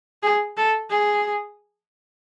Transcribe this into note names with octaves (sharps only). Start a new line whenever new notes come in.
G#4
A4
G#4